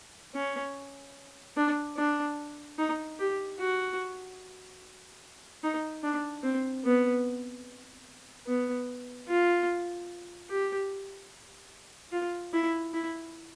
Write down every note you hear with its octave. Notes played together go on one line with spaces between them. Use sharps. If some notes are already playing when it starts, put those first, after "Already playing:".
C#4
D4
D4
D#4
G4
F#4
D#4
D4
C4
B3
B3
F4
G4
F4
E4
E4